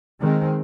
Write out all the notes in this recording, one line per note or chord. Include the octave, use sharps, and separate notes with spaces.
D#3 G#3 C4